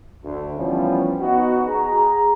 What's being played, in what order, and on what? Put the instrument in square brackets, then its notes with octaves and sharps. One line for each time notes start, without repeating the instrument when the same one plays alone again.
[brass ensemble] D2
E3 F3 G3 B3 C#4
B3 D#4 F#4
G#4 A#5